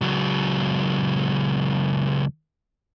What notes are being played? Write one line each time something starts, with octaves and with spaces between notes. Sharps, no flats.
C#2 F#3